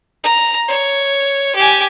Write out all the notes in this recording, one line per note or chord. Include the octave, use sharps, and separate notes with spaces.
A#5
C#5
G4 G#5